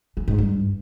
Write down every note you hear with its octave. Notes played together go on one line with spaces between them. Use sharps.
E3
G#2
G2